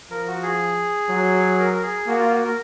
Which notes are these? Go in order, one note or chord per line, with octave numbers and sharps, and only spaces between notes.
F3 A#4
F#4
G#4
F#3
A#4
A#4
G#4
A#3 F#4
F4
F#4
A#4